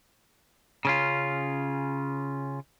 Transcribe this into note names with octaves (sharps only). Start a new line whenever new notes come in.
C#3 C#4 F4